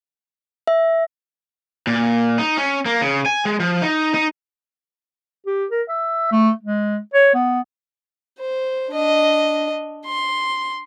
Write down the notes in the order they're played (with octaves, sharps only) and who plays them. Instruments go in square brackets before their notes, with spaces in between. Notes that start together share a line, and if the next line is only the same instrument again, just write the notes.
[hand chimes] E5
[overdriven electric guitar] A#2
D#4
C#4
A#3
C#3
G#5
G#3
F3
D#4
D#4
[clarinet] G4
A#4
E5
A3
G#3
C#5
B3
[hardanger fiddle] C5
D4 D#5
C6